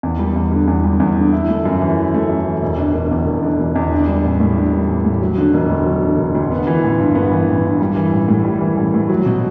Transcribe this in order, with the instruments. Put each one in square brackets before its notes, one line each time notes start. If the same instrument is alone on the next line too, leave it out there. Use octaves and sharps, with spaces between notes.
[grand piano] E2
G3
E2
D3
E2
G3
E2
D3
E4
A3
F#2
E3
E4
A3
F#2
E3
E1
D3
E1
E2
E1
D3
E1
E2
D4
G3
A1
A2
D4
G3
A1
A2
F#3
D3
E1
D2
F#3
D3
E1
D2
B3
E3
A1
G2
B3
E3
A1
G2
G3
E3
A1
A2
G3
E3
A1
A2
F#3
B2